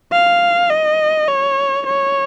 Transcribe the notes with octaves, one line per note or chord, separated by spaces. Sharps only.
F5
D#5
C#5
C#5